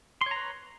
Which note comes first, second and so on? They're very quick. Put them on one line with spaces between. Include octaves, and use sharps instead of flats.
C6 C#5 A#5 B4